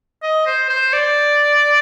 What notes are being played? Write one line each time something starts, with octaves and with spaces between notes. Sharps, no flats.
D#5
C5
C5
D5